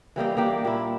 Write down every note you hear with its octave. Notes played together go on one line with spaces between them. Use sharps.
E3 G3 A#3 D#4
A#3 D4 G4
A#2 E4